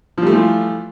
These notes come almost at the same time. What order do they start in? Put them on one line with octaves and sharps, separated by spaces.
F3 G3 A3 E3 F4